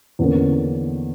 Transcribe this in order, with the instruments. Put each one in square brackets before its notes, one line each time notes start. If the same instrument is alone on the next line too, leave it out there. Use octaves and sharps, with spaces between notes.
[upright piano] E2 D3 A#3 C#4